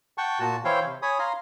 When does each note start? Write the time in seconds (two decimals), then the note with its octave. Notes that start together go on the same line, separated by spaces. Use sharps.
0.18 F#5 G5 A5 C#6
0.40 A#2 F#4 A5
0.65 E3 E4 C5 C#5 F5 G5
0.85 C3
1.02 C#5 G#5 B5 D#6
1.19 F5 A#5 C6